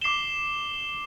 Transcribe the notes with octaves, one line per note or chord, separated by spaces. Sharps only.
D6 C7 E7 G7